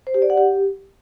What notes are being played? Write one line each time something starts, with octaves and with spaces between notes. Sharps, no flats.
C5
G4
D5
F#5
G4